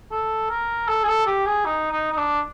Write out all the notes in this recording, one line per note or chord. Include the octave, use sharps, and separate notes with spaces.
A4
A#4
A4
G#4
A4
G4
G#4
D#4
D#4
D#4
D4